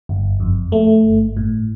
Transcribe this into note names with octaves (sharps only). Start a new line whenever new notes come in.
G1
F2
A3
G1
A2